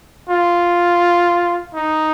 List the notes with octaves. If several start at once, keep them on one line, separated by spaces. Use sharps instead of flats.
F4
D#4